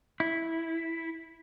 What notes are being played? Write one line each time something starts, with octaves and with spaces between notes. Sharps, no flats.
E4